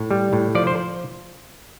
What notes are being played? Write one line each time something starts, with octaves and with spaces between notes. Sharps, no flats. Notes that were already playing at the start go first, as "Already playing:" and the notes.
Already playing: A2
G3
A2
F3 D5
C5